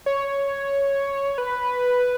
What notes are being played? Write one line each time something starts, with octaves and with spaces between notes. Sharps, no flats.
C#5
B4